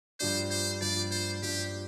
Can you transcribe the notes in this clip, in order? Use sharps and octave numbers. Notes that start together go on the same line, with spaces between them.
G2 F3 D4 C5
C5
G2 F3 D4 D5
C5
G2 F3 D4 G4